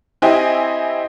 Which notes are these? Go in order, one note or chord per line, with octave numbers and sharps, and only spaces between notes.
C4 E4 G4 D#5 G#5